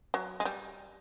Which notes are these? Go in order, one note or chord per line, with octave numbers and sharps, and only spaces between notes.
F#3
G#3
G3